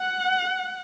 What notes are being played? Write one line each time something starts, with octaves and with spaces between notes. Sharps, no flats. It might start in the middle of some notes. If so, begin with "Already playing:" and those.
Already playing: F#5